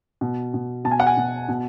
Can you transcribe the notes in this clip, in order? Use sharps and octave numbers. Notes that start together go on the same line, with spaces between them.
B2
B2
B2 A5
G#5
F#5
G#5
B2
B2